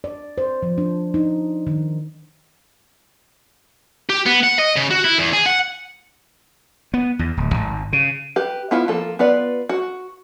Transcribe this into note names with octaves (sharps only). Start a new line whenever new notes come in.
D5
C5
F3
D4
D#4
D#3
G4
B3
F#5
D#5
C#3
F#4
E4
E2
G#4
F#5
B3
E2
D1
G#1
C#3
G4 B4
B3 E4 F4
F3 A#3 A4
B3 F4 B4 D5
F#4